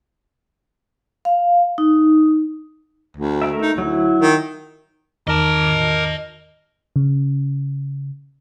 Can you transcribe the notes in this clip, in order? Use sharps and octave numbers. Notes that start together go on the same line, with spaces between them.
F5
D#4
D2
A3 A#4 E5
D#4
D2 F#3 E4
D#3
E2 D#3 A#4 D#5 A5 D6
C#3